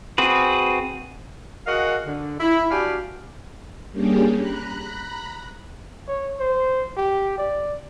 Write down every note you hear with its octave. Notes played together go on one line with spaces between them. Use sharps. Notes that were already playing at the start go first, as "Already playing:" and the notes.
C4 F#4 G#4 B4
F#4 G#4 A#4 D#5 F5 F#5
D3
E4
D4 F#4 G4 D5 F5 G#5
G3 A#3 C#4 D4 G4 G#4
A#5 B5 F#6
C#5
C5
G4
D5